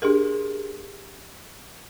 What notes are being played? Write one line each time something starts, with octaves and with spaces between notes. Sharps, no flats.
D4 G4 G#4 A#4